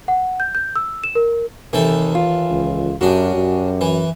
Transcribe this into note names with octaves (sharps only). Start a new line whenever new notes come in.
F#5
G6
G6
E6
E7
A#4
D#2 C3 D#3 E3 A4
F4
C#2
F#2 C#3 D4 F#4 G4
F#2
E3